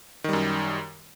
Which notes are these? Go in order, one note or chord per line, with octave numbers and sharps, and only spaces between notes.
F#2 D#3 G3